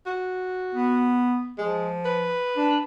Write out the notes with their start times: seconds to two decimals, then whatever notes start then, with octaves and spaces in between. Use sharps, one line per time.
0.06 F#4
0.74 B3
1.58 F3 G#3
2.05 B4
2.57 D4